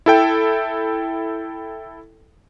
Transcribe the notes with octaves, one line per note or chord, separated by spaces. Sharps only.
E4 A4 G5